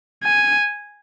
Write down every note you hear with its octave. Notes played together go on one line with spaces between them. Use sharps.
G#5